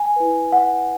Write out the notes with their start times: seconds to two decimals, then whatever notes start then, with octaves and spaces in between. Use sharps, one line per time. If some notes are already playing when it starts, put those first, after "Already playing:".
Already playing: G#5
0.16 E4 B4
0.52 F#5